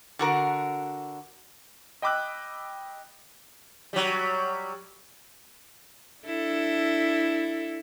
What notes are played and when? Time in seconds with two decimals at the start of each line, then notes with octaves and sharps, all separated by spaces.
0.19 D3 F#4 A#4
2.02 D#5 G5 B5 D6 E6 F#6
3.93 F#3 G3
6.25 D4 E4 A4